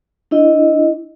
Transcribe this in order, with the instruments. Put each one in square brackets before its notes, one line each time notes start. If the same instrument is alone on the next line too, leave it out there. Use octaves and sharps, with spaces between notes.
[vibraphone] D4 E4 D#5